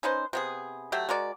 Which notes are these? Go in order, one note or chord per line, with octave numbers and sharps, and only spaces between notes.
C#4 D#4 B4 C5
C3 B3 G#4
F#3 A3 G4 E5
G#3 F#4 A#4 D5